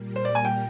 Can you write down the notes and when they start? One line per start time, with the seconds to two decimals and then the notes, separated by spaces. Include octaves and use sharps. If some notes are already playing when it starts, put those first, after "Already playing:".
Already playing: A#2 G3 A#3
0.16 C5
0.25 D5
0.35 G#5
0.45 G5